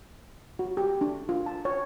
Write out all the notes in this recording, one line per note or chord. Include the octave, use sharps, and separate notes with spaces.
F#4
G4
D4
F4
A5
C#5